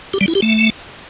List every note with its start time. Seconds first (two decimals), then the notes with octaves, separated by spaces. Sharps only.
0.14 G4
0.21 G3
0.28 E4
0.35 G4
0.42 A3